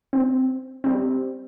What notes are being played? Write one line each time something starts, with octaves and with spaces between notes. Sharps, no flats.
C4
G3 C4